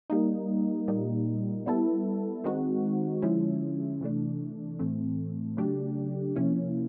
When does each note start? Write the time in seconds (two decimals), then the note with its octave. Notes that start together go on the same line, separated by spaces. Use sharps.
0.10 G3 A#3 D#4
0.88 A#2 G3 A#3 D#4
1.66 G3 B3 E4 A4
2.44 D#3 G#3 C4 D#4 F#4
3.22 D3 F3 G#3 C#4 E4
4.01 C3 E3 A3 D4
4.79 A2 E3 A3 C4
5.57 C#3 F#3 A3 D4 G4
6.36 C3 F3 A#3 C#4 E4